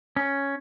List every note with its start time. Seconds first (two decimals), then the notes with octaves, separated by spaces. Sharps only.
0.16 C#4